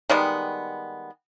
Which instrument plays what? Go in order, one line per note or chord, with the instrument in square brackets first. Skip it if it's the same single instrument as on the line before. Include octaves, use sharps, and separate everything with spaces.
[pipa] D#3 G3 G#3 B3